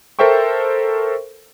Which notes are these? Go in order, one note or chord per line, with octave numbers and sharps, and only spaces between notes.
A4 A#4 C5 E5 G5 C#6